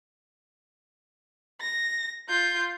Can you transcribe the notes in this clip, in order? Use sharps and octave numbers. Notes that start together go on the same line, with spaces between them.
A#6
F4 G6